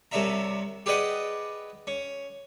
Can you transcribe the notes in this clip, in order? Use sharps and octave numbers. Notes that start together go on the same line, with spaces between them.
C2 C3 C#4 D4 E5 A#5
G4 G#4 B4 D5 D#5 F#5
C#4